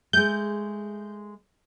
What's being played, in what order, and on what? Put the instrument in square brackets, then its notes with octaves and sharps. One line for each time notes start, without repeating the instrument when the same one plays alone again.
[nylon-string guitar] G#3 A3 [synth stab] G6